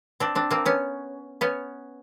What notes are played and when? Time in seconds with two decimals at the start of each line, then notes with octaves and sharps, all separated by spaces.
0.20 C4 D4
0.35 C4 D4
0.51 A#3 C4
0.66 B3 C#4
1.41 B3 C#4